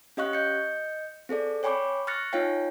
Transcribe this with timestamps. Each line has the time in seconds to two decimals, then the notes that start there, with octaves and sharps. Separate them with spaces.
0.17 C#4 G4 D#5 F5 C#6 F#6
0.33 D#5 G6 C#7
1.29 C4 G#4 A4 D5
1.63 C#5 G5 G#5 B5 C#6 D6
2.07 C#6 F6 F#6 A6 A#6 C#7
2.33 D#4 F4 C#5 F5 G5